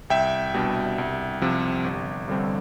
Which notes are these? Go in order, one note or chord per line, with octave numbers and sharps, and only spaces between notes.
C2 E5 G5
B2 G3 D4
C2
C3 F3
G1
G2 D3 G3 C4